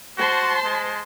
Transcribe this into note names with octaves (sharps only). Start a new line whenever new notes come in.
F#4 C5 A5 C6
G#3